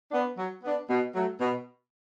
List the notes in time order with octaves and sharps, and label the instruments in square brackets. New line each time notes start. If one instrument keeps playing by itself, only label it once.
[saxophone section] B3 D4
F#3
B3 D4
B2
F#3 A3
B2